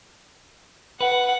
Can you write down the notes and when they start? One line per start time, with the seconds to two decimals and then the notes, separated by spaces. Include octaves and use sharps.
1.01 B4 F#5